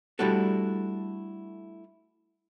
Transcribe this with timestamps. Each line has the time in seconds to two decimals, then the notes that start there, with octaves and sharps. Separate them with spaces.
0.19 G3 A3 D4 E4 F#4 A4